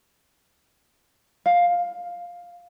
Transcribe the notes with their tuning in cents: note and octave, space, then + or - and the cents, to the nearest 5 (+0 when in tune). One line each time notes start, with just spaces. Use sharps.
F5 +10